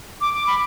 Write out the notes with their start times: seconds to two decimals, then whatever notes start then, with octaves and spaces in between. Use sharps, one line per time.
0.21 D6
0.34 D6
0.47 B5